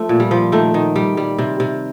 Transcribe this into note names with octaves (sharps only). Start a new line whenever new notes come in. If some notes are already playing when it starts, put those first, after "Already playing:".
Already playing: F3 A3
A#2
G3
F3
D#3 A3
D#3
G3
G3
C3
C3